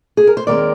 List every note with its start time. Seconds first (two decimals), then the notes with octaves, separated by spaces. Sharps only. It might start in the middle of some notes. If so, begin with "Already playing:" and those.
0.17 G#4
0.27 A#4
0.37 C5
0.47 D#2 D#3 G#3 C4 A#4 D5